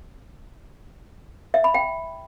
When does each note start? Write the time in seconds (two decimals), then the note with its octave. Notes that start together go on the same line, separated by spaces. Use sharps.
1.54 E5
1.64 B5
1.74 G5